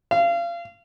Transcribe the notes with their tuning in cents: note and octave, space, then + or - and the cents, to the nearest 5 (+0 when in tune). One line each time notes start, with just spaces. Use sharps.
F5 -30